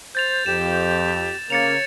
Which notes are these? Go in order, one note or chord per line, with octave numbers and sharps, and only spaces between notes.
C5 G6 A6 F7
F2 G4 E7
C#3 A#3 C#5 A6 C#7 F7